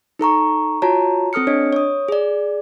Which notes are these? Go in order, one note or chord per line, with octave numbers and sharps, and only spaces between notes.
D#4 A4 A#5 C#6
F4 F#4 C#5 A5 A#5
C4 A4 D#6 F6 C#7
D4 C#5 D#5
C#5 D#6
G#4 D5